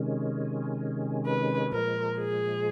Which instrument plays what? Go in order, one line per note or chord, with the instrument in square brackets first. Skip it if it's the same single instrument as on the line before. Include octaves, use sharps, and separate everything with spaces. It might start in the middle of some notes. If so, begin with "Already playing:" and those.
Already playing: [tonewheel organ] C3 D#3 G#3 C#4
[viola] B4
[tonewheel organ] A#2 F3 G#3 [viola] A#4
[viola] G#4